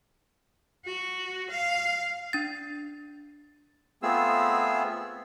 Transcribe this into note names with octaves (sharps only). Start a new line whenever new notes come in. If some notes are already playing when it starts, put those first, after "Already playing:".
F#4
F5
D4 A6
A3 B3 C4 F4 G#4 E6